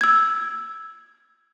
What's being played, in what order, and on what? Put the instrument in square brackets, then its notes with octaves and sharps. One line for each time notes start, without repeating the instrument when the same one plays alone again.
[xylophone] E6 G#6